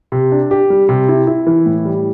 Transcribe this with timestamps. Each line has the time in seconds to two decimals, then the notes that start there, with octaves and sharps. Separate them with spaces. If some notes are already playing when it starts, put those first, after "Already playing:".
0.12 C3
0.32 D4
0.51 G4
0.70 G3
0.89 C3
1.08 E4
1.27 E4
1.47 E3
1.66 A2
1.85 G3